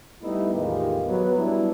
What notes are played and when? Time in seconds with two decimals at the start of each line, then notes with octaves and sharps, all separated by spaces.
0.22 G3 A3 B3 D#4 E4
0.53 E2 A2 D#3 G#3 F4 G4
1.08 F#3 B3 B4
1.37 G3 B3 D4 E4